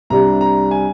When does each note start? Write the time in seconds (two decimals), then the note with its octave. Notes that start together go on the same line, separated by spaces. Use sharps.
0.10 C2 C3 G3 D4 A#5
0.41 A#5
0.71 G#5